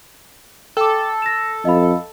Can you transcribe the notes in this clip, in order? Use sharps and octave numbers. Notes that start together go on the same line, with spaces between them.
A4 G5 D6
A#6 E7
F2 D#5 F5 B5